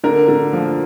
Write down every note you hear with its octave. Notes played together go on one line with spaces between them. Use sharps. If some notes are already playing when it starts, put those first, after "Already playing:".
D3 A#4
D3
F3